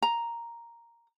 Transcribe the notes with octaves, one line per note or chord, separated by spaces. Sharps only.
A#5